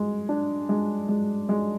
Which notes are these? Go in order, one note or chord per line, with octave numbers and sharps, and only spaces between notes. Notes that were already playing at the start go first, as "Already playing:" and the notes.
Already playing: G#3
D4
G#3
G#3
G#3